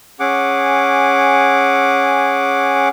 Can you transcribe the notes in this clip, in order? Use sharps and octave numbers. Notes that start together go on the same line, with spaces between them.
C#4 G#4 F#5 D6